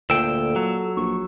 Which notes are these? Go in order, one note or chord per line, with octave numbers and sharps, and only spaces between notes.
D2 A#2 A4 G5 E6
F#3
A#1 C#6